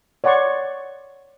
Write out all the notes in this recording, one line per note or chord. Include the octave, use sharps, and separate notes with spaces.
C#5 D5 F#5 C6 C#6